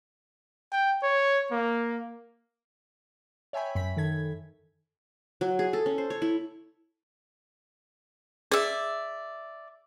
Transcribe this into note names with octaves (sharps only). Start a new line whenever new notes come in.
G5
C#5
A#3
C#5 E5 G5 G#5 B5
F#2 B5 B6
D#3 A4 G#6
F#3
G#4
A4
C#4
C5
C#5
E4
G#4 D5 E5